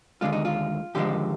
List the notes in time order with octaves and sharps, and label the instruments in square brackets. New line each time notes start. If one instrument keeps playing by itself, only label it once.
[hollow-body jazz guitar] D#2 D3 G#3 F4
D#4
F4
D#2 D3 F3 G#3 G4